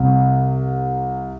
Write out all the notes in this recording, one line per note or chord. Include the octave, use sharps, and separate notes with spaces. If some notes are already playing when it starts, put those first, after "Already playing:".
Already playing: C2 C3